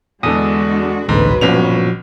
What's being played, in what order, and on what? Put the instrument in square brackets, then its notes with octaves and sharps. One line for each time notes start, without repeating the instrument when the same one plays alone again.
[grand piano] E2 D3 [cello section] G#3 D4 F#4 [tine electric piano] A4 D#6
[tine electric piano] A1 D2 D3 [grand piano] G#2 [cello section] B2 F#3 B4
[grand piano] G1 C#4 F7 [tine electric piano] A#2 F3 F#4